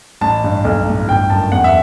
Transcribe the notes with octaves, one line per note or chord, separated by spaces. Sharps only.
A1 A5
G2
B1
A2
G1 G5
F#2 A5
E2 F#5
E5